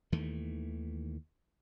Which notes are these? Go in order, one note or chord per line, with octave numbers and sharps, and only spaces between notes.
D#2 D#3 E3 A3